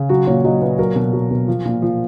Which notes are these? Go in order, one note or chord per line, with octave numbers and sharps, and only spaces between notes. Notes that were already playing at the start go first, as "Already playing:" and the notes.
Already playing: C#3
F#3 F#4
A#2 C#5
F#3 D#5
A#2 B4
F#3 A#4
B2
F#3
B2
F3
A#2
F3